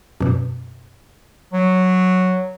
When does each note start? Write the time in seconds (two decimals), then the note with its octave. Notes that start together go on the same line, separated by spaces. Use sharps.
0.21 F#2 B2
1.53 F#3